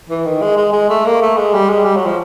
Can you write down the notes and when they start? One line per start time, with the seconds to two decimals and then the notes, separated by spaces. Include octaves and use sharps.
0.09 E3
0.26 D#3
0.42 G#3
0.57 G#3
0.73 G#3
0.89 A3
1.06 A#3
1.22 A3
1.37 G#3
1.54 G3
1.69 G#3
1.85 G3
1.96 F#3
2.06 F3